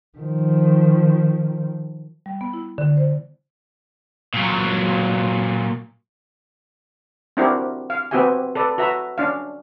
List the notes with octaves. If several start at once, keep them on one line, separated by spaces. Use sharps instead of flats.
D#3 F3
G3
B3
E4
D3
C5
A#2 F#3
C4 D4 E4 F#4 G4 A#4
F5
B3 C4 F#4 G4 E5 G#5
A4 B4 D5
F#4 B4 E5 A#5
C#4 D4 F5